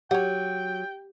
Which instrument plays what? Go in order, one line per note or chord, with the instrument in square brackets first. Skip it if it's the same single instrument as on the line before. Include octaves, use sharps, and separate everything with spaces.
[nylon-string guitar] F#3 [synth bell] G4 [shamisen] C#5 F#5 [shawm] G5